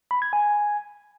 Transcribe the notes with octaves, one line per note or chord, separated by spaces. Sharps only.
B5
G#6
G#5